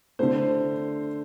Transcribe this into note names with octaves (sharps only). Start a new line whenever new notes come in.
D3 A3 C5